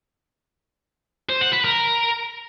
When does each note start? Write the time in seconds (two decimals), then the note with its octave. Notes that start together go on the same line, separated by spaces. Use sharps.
1.29 C5
1.41 F#5
1.53 B4
1.65 A#4